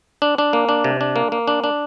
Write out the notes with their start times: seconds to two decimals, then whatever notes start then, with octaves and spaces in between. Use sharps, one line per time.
0.22 D4
0.38 D4
0.53 A#3
0.69 D4
0.84 C3
1.01 D4
1.16 A#3
1.32 A#3
1.48 D4
1.64 D4